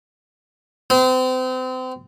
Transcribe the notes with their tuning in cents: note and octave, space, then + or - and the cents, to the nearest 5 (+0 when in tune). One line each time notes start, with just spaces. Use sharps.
C4 -35